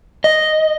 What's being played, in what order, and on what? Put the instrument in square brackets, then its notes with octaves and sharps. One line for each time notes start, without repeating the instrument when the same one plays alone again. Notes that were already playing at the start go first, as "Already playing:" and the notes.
[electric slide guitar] D#5